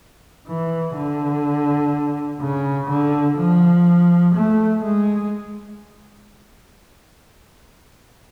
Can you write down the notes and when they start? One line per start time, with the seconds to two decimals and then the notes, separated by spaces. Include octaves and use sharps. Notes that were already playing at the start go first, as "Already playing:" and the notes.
0.47 E3
0.96 D3
2.41 C#3
2.89 D3
3.38 F3
4.35 A3
4.83 G#3